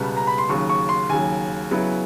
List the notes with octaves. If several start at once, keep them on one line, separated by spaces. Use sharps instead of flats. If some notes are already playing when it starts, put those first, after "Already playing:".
Already playing: C#2 B2 G3 B3
A#5
B5
C6
D#2 C#3 F#3 C#6
C#6
C6
D#2 C#3 F#3 G#5
C#3 F#3 B3 E4